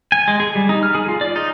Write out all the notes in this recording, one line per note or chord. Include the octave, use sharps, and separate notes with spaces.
G#5
G#3
G#4
G3
D#4
F6
G#4
F4
D5
D#4